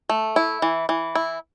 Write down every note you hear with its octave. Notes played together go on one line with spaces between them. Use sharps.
A3
E4
E3
E3
E4